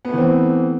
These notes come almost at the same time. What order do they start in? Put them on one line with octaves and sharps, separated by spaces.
B3 A3 E3 C4